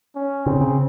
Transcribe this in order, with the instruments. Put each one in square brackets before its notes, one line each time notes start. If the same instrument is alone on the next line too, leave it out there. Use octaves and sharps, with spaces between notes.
[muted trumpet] C#4
[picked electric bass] C#3 [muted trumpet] C4
[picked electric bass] C#3